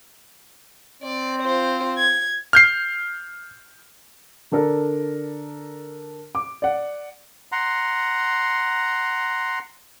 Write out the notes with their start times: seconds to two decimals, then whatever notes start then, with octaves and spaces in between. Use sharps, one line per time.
1.03 C4 D5
1.42 F4 C5
1.97 G#6
2.53 F6 G6 C7
4.52 D3 D4 A4 A#4
6.35 D6
6.62 D5 F#5
7.52 F#5 A#5 C6